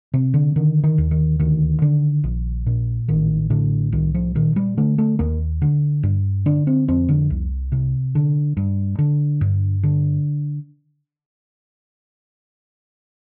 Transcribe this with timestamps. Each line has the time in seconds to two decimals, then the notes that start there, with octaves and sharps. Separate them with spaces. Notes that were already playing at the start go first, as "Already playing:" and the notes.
0.14 C3
0.34 D3
0.56 D3 D#3
0.83 D#3
0.98 D#2
1.11 D#3
1.39 D2 D#3
1.82 D3
2.24 A#1
2.66 A#2
3.08 A1 D#3
3.50 A2 D3
3.92 C2 D#3
4.14 F3
4.35 A#2 D#3
4.56 G3
4.77 D3 A3
4.98 A3
5.19 D#2 A#3
5.62 D3
6.03 G2
6.46 D3 D4
6.67 C4
6.88 F2 C4
7.09 D3
7.30 C2
7.72 C3
8.15 D3
8.57 G2
8.99 D3
9.41 G2
9.83 D3